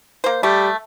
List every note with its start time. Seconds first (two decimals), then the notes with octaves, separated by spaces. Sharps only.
0.24 A#3 C5
0.43 G3 A3